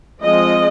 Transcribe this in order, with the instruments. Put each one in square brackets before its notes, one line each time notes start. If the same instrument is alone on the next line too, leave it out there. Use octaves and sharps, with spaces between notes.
[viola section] F3 G#3 C4 D#5